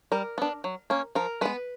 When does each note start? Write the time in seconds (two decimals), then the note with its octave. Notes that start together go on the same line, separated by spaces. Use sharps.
0.12 G3 A#4
0.38 B3 D4
0.64 F#3
0.90 A#3 C#4
1.15 F3 A#4
1.41 G#3 B3 B4